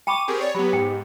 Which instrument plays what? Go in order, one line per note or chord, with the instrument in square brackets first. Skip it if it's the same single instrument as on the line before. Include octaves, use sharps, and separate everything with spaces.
[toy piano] G5 B5 C#6 [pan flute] D6 [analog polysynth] D#7
[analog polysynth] C4 G4 G#4 [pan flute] A#4
[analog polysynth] C#5 [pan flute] D5
[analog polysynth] F#3 B3 [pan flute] G4 [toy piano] B5
[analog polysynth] G#2 [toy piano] G5